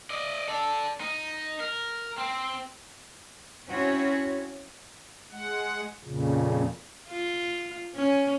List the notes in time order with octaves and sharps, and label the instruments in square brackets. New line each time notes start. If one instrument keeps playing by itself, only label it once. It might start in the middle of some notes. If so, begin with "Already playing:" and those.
[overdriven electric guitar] D5 D#5
A4 D5
D#4
A#4
C4
[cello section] C4 C#4 E4 F#4 C#5
[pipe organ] G#3 F#5
F2 A#2 C#3
[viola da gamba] F4
C#4